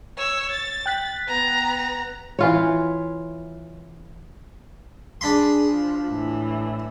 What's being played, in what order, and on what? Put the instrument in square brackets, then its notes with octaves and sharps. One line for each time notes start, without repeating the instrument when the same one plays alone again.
[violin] C#5 E6
A6
[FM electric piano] G5 F#6 B6
[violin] B3 A#5
[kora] E3 F4 C#5
[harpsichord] D4 B5 C6 [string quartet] G#4
[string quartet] F3
A2 E3